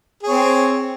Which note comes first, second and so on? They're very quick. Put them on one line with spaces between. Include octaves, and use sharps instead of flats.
G#4 C#5 C4